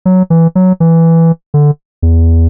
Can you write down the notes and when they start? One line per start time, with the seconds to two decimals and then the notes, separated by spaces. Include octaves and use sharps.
0.06 F#3
0.30 E3
0.55 F#3
0.80 E3
1.54 D3
2.02 E2